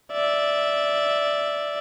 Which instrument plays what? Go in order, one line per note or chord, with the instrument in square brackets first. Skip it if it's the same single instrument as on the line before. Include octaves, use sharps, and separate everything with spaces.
[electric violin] D5 E5